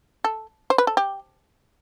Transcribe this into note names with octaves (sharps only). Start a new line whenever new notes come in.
A4
C5
B4
A4
G4